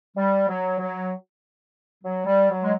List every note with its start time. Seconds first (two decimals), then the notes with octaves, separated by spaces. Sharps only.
0.17 G3
0.49 F#3
0.79 F#3
2.03 F#3
2.25 G3
2.49 F#3
2.63 G#3